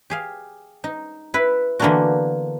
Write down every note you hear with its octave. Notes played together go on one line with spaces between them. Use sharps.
G4 G#4 F5
D#4
E4 B4
D3 E3 A#3 B3 D4 F#4